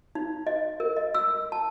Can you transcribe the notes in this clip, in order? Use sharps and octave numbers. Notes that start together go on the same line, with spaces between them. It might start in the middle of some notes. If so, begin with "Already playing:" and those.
D#4
D#5
A#4
D#5
E6
A5